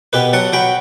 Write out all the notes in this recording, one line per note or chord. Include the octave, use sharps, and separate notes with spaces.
B2 G4 B4
F#3 F#5 A5
F#3 G5 B5